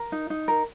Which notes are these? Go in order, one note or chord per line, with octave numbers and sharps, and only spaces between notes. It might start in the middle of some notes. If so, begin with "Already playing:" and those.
Already playing: A#4
D#4
D#4
A#4